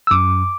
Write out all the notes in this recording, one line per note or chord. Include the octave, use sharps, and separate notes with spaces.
E6
F#2 D6